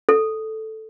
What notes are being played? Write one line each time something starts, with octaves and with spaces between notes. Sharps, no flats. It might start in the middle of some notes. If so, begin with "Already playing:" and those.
A4